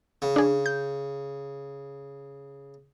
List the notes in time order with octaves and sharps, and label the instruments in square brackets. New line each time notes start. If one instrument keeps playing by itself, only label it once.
[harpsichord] C#3
[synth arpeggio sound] D4 G#4
G6